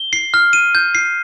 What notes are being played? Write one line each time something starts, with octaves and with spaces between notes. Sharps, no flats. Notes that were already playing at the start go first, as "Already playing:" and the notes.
Already playing: G7
C7
F6
D#7
G6
C7